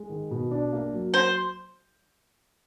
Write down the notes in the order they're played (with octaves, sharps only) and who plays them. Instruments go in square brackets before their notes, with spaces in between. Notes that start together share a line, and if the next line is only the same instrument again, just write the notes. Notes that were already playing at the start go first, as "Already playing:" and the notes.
Already playing: [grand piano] G#3
D#3
B2
D4
A#3
F#3
[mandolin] C5